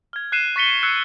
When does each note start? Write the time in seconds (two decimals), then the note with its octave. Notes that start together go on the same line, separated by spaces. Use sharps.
0.13 F6 G#6
0.32 F#6 C7 D#7 E7
0.56 C#6 A6 B6 C#7 G7
0.83 C#6 E6 F#6 G#6 C7 C#7